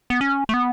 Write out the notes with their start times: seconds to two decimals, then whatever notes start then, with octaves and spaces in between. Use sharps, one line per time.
0.10 B3
0.21 C#4
0.49 A3
0.54 B3